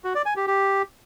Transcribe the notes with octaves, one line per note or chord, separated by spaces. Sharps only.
F#4
D5
G#5
G4
G4